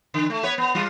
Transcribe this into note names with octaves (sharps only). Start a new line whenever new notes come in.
D3
A3
B3 B4 C#5
B3
G3 F4